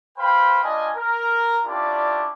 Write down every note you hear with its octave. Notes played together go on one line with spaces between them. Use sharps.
B4 C5 F5 G5 B5
G3 D4 F4 D#5 G#5
A#4
C#4 D4 E4 F4 G4 D5